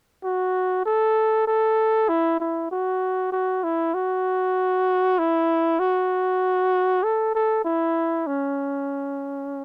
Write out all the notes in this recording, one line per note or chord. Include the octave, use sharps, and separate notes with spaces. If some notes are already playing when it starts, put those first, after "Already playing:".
F#4
A4
A4
E4
E4
F#4
F#4
E4
F#4
E4
F#4
A4
A4
E4
C#4